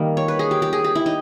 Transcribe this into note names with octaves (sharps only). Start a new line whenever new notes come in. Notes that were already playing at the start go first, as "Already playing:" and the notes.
Already playing: D#3 G3 A#3
C#5
B4
G#4
G4
G4
G#4
G4
E4
D#4